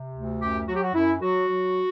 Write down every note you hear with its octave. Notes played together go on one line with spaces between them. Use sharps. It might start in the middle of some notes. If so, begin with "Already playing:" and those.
Already playing: C3
D2
F#2 G4
F#3 F#4
G4
F#4
F#2 E4
F#3 F#4
F#3